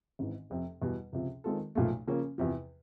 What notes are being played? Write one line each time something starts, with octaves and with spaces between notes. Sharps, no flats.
G#1 G#2 E3
F1 F2 C3
E2 B2 G3
C#2 C3 F3
D#3 G#3 C4 F4 A4
B1 A#2 F3 A3
C#3 F3 A#3 C#4
E2 C3 F3